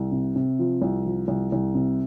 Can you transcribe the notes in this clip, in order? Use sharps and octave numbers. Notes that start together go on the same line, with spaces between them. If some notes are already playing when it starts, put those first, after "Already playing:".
Already playing: C2
C3
C3
F3
C2
F3
C2
C2
C3